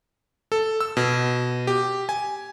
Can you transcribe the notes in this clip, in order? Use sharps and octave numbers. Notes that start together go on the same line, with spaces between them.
A4
E6
B2
G4
G#5